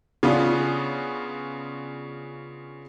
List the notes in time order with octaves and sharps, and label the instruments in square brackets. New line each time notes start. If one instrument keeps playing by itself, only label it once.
[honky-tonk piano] C#3 B3 D4 F4